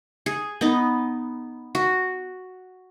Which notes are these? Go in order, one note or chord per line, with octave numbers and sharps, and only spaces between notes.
G#4
B3 D#4
F#4